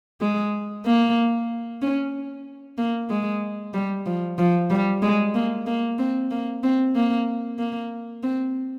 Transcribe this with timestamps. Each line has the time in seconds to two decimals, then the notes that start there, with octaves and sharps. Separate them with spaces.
0.21 G#3
0.86 A#3
1.82 C#4
2.78 A#3
3.10 G#3
3.74 G3
4.06 F3
4.38 F3
4.70 G3
5.02 G#3
5.35 A#3
5.67 A#3
5.99 C4
6.31 A#3
6.63 C4
6.95 A#3
7.59 A#3
8.23 C4